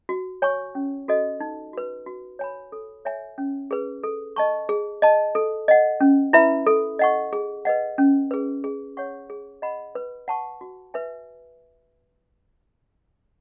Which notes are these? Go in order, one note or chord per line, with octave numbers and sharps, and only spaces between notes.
F#4
C#5 G#5 C#6
C#4
F#4 A4 D#5
D#4
F#4 B4
F#4
C#5 G#5 B5
A4
C#5 E5 G#5
C#4
G#4 B4
A4
D#5 A5 C#6
G#4
D#5 A5
A4
D#5 F#5
C#4
E4 B4 E5 B5
A4
D#5 F#5 C#6
G#4
B4 D#5 F#5
C#4
G#4 B4
G#4
C#5 F#5 C#6
G#4
D#5 F#5 B5
B4
F#5 A5 C#6
F#4
B4 E5 G#5